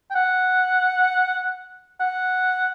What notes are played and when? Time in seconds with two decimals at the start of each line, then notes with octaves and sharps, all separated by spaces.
0.10 G5
0.15 F#5
2.00 F#5